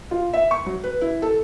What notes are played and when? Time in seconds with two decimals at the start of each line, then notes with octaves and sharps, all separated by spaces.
0.11 F4
0.33 E5
0.51 C#6
0.66 F#3
0.84 B4
1.01 E4
1.22 A4